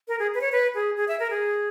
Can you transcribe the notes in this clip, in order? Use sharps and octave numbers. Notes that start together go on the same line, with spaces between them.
A#4
G#4
B4
C#5
B4
G#4
G#4
E5
A#4
G#4